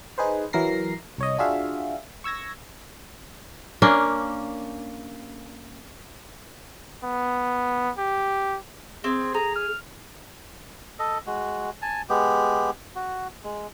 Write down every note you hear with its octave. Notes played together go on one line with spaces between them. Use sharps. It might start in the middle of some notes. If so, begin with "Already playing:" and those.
D#4 G#4 B4 C5
E3 F#3 A#4 A#6 C7
C2 C#5 D#5
D4 F4 F#4 G#4 E5 F5
C#6 E6 G#6 A#6
A#3 C#4 D4
B3
G4
C4 G#4
G#4 A#5
F6
A4 D#5
G#3 F#4
G#5 A5
G#3 B3 G4
F#4
G#3